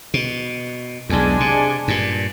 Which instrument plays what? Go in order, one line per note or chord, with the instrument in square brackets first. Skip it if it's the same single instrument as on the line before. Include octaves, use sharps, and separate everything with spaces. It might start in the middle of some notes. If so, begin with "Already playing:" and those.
[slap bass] B2
[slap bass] B1 E2 [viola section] G#3 D4 G#5
[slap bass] C3
G2 A#2